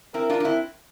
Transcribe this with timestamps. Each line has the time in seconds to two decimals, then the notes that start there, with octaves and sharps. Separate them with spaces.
0.14 C4 E4 A#4
0.30 D4 F4
0.40 D4
0.45 C4 E4